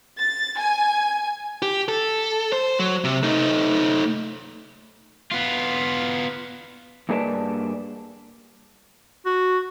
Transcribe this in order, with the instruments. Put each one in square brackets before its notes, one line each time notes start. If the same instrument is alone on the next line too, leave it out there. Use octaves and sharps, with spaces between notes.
[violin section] A6
G#5
[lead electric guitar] G4
A4
C5
F#3
C3
A3 D#4
[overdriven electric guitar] B3 F4
[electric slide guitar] G2 A#3 G#4 B4 D5 A5
[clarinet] F#4